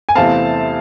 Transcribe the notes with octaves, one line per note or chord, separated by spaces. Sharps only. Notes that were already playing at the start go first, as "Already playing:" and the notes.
G#5
E2 C3 E3 A3 C4 F5 A5